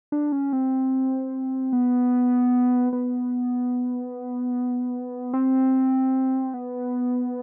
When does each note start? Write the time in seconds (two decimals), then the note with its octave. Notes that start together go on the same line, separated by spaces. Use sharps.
0.12 D4
0.32 C#4
0.53 C4
1.73 B3
2.93 B3
5.33 C4
6.54 B3